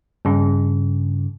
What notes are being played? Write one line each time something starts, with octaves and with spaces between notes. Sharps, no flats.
G2 C#3